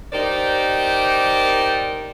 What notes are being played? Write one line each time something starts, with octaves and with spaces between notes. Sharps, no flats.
D#4 G4 A#4 C5 D5